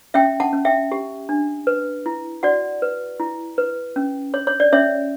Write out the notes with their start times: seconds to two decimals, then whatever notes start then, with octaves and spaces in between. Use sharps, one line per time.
0.14 C#4 E5 G5
0.40 F#5 A5
0.53 C#4
0.65 E5 G5
0.92 G4
1.29 D4
1.67 B4
2.06 E4
2.43 F#4 D5 F#5
2.82 B4
3.20 E4
3.58 B4
3.96 C#4
4.34 C#5
4.47 C#5
4.60 D5
4.72 C#4 C#5 E5